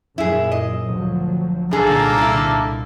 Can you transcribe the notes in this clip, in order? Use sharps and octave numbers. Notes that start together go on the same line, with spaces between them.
F#2 A#2 E4 G#4
D#5
D2 F3 F#3
C2 A#2 D3 A#3 D#4 G#4 A4
D3 E4